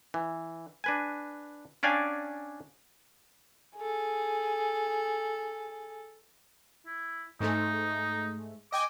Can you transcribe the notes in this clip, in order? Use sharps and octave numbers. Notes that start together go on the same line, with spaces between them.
E3
D4 B4 G#5
C#4 D4 D5 F5 G5 G#5
G#4 A4
E4
G#2 G#3 A3 D#4
D#5 G5 G#5 D6